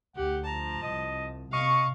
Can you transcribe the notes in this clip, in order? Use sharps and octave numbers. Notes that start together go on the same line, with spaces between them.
D2 G4 F#5
F3 A5 A#5
C2 D#5
C3 D#5 F5 C#6